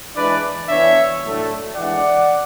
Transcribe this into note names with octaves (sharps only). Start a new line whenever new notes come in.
E3 G#3 D4 B4 D5
E3 B3 D4 C#5 E5
A2 F#3 A3 D4
E3 G#3 D4 D5 F#5